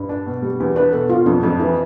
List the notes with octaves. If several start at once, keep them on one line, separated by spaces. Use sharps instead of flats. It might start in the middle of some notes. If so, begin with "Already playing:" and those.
Already playing: G2
D4
B2
G3
E2
D4 B4
B2 A4
B2 F4
F2 D4
F2 D4
E3 E4